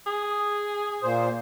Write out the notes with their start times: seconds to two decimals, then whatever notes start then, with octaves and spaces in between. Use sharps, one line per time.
0.07 G#4
1.03 A#2 C5